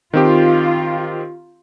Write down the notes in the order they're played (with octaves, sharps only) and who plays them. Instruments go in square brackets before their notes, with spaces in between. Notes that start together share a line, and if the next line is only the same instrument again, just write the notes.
[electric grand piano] D#3 C4 G4 [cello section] F4